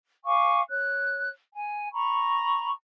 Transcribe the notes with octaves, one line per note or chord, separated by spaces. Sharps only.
F5 G#5 C#6 D6
C#5 F#6
G#5
A#5 B5 C#6